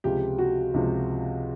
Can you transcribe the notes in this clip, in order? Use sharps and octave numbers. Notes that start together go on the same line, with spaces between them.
C#2 C3 F3 G4
F#4
C#2 C3 F3